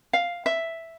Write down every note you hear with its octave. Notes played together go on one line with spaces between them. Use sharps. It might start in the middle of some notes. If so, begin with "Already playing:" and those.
F5
E5